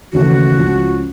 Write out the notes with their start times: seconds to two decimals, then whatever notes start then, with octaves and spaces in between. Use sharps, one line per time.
0.13 D#2 C#3 E3 A3 F#4
0.57 C#2 C#3 F3